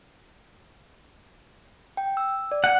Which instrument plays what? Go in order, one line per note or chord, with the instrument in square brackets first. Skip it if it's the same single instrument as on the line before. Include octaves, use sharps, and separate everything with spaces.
[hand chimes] G5
E6
D5
[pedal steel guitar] F#5